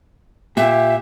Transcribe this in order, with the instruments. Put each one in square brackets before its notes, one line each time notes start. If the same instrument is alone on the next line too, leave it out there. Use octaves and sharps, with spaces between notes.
[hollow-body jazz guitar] A#2 [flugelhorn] G4 [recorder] E5